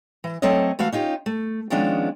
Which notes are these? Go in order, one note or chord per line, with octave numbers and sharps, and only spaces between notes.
E3
F#3 A3 C4 A4 C#5 D#5
E3 A3 F#4 F5
C#4 D#4 F4 G4
A3
D#3 F3 G#3 B3 C#4 D4